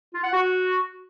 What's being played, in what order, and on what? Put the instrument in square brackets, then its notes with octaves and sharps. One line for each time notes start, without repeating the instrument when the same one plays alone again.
[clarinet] F4
F#5
F#4